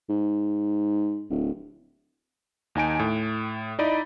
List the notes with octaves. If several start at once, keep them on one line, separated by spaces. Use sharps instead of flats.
G#2
D1
D#2 D#4 G#5 D7
A2
D#4 E4 D5 D#5 B5